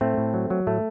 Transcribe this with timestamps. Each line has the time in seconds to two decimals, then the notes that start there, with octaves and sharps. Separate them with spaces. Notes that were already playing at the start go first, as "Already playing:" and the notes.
0.01 A2 A3 C4
0.17 A2
0.34 F#3
0.50 F#3
0.67 A2 A3